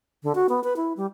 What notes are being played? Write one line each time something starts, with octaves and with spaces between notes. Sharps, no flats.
D3
F#4
B3
B4
E4
G3